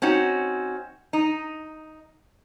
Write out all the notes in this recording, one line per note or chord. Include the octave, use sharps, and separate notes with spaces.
C4 C#4 D#4 F#4
D#4